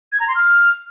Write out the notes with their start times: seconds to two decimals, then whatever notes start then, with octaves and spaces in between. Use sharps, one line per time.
0.12 G#6
0.20 A#5
0.28 C6
0.35 F6